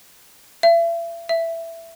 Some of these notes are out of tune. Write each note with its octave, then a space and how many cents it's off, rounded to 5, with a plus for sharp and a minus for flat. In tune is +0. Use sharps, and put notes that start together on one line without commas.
E5 +40
E5 +10